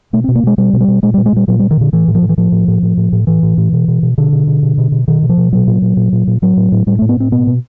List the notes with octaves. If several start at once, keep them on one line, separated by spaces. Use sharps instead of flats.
B2 A3
B2 C4
A#3
B2 G#3
B2 G3
B2
G3
B2
A#2 G#3
A#2 G3
G#3
A#2 G3
A#2 F#3
A#2 G3
D#3
A#2 D3
A2 E3
A2
F3
A2
E3
A2 F3
A2
A2
A2
A2
A2
A2 E3
A2
A2
B2
B2
B2
B2 D3
B2
B2
B2
B2
B2
B2 D#3
B2
F3
B2
A#2 F#3
A#2
A#2
A#2
A#2
A#2
A2 F#3
A2
A2
A2 G3
A2 A3
B3
A2 C4
B2 B3
B2